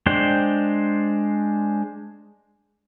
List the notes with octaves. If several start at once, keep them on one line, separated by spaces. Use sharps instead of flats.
G#3 D4 C5 G5